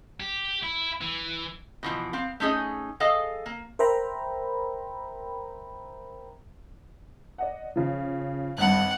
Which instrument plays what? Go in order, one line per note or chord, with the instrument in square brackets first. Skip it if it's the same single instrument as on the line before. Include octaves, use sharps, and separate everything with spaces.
[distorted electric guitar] G4
E4
E3
[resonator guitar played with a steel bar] B2 E3 F3
C4 F5
A3 C#4 D#4 G#4
G#4 A4 D#5 F5
A#3
[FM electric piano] A#4 C5 E5 G5 A#5 B5
[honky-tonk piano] D5 D#5 F#5
C#3 F3
[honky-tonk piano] G#1 G2 [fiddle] F#5